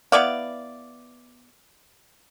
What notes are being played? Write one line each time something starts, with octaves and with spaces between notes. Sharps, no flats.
B3 E4 D5 F5